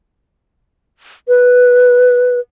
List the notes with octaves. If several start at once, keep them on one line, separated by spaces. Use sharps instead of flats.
B4